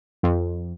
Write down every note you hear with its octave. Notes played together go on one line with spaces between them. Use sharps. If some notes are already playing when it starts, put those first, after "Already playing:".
F2